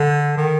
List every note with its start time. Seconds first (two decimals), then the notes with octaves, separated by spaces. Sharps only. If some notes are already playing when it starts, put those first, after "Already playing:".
Already playing: D3
0.37 D#3